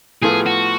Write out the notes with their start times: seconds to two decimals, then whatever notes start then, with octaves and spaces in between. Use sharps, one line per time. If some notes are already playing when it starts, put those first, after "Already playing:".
0.22 A2 F3 B3 F4 G#4 A4
0.46 F#4